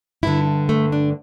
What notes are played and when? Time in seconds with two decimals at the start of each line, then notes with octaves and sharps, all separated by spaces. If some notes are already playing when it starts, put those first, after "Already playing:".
0.23 G2 D3 E4
0.69 A3
0.92 D4